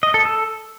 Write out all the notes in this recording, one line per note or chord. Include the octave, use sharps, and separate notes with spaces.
D#5
A4
A4